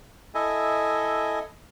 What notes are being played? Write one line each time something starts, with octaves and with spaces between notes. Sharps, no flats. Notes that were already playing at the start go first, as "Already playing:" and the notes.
E4 A4 D#5 E5 G#5